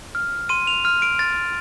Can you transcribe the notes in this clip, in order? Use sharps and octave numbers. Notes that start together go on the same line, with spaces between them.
F6
C6 D#7
F7
F6
D7
C6 A6